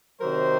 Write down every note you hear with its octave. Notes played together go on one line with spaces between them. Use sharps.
C3 D#3 F#3 A#4 C5